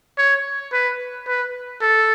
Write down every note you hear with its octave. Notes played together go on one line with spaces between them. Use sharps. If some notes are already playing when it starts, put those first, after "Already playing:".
C#5
B4
B4
A4